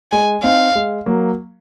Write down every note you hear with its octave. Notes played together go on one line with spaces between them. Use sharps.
G#3 G#5
C4 D#4 F5
G#3
F#3 A#3